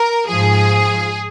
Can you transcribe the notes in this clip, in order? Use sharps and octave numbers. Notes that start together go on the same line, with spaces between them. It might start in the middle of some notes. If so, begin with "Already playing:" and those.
Already playing: A#4
G#2 F3 G#4